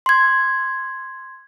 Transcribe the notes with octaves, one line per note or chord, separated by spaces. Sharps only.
C6 G#6